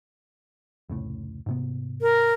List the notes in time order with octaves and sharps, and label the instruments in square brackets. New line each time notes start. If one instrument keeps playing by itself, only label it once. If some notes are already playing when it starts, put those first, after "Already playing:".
[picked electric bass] F1 C#2 A2
G#2 C3 B3
[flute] A#4